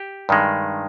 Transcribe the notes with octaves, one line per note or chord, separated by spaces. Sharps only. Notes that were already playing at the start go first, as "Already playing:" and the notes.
Already playing: G4
G2 D#3 G#3